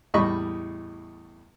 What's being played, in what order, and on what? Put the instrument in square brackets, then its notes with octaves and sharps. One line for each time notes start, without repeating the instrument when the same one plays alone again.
[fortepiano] E2 A2 G3 D#5 B5 C#6